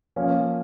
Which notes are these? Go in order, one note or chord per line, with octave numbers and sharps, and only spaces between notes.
F3 A#3 C#4